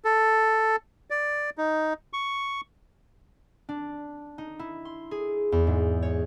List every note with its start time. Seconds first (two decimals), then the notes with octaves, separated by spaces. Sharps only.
0.05 A4
1.10 D5
1.58 D#4
2.13 C#6
3.69 D4
4.38 D#4
4.59 E4
4.85 C6
5.11 G#4
5.52 E2
5.67 G#2
6.02 C#5